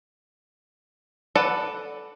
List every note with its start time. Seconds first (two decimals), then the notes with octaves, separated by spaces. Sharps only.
1.35 A4 B4 D5 F#5